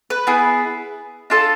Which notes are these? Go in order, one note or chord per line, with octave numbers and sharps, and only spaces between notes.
B4
B3 E4 G#4
D4 F4 A4 A5